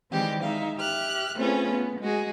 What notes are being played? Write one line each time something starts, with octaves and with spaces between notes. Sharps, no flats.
D#3 E3 G3 G#3 C4 G4
G#3 D#4 E5 F5
G4 E5 F6 F#6
A3 C4 C#4 F4 G#4 B4
B3
G#3 F#4 G#4